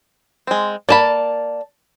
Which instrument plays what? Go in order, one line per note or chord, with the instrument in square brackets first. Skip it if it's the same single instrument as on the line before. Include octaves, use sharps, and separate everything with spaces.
[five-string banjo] G#3 C4
[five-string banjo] A#3 D#5 B5 [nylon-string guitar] D5 A5